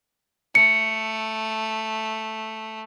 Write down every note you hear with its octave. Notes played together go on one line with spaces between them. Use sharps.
A3 C#7